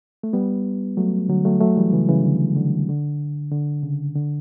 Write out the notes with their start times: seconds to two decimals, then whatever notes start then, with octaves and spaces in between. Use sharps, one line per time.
0.23 A3
0.33 G3 B3
0.97 F#3 A3
1.29 D3 F#3
1.45 F#3 A3
1.60 F#3 A3
1.76 E3 G3
1.93 C#3 E3
2.09 C#3 E3
2.24 D3
2.56 D3
2.89 D3
3.51 D3
3.83 C#3
4.16 D3